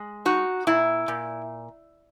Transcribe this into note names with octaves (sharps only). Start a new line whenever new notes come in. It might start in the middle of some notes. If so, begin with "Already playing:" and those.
Already playing: G#3
D#4 F#4
A#2 E4
A#2